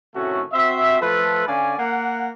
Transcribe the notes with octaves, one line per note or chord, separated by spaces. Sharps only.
A2 C3 D#3 A3 C#4 F#4
C4 F#4 C5 E5
F3 A3 F4 A4 B4
D3 C#4 D5 F5 G#5
A#3 F#5